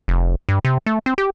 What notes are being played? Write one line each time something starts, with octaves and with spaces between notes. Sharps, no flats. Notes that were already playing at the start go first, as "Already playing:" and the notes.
F1
G2
C3
A3
C4
G4